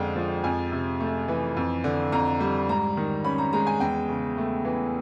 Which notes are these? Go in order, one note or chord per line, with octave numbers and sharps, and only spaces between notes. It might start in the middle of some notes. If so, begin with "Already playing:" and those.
Already playing: F2 D3 G#3 G5
F3
F2 G#5
C3
A3
E3
F2
D3
F2 A#5
G3
G#2 A#5
D#3
C#4 B5
A#5
G#3 A#5
G#5
E2 G5
C#3
A3
E3